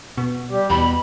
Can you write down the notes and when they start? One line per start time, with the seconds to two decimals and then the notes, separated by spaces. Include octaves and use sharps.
0.18 B2
0.50 G3 G4
0.70 E2 B2 B5